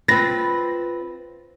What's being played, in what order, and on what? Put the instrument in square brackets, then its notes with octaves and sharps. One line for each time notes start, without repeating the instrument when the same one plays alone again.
[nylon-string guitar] C4 F4 B4 [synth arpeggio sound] A6 A#6